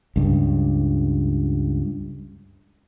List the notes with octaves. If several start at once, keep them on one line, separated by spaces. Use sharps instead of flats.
C#2 G2